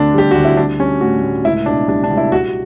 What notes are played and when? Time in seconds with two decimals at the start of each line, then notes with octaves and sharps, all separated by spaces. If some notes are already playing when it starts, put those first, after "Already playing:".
Already playing: D2 D3 D4
0.14 G3 G4
0.31 D2 F#4
0.45 E4
0.57 G3 D4
0.80 G3 C#4
1.01 A2 F#4
1.22 A2
1.44 C#2 E4
1.66 B2 D4
1.88 G3 D4
2.04 D4
2.10 C#2
2.17 E4
2.32 G3 F#4